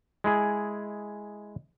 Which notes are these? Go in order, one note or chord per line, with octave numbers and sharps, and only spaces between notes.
G#3 E4 G#4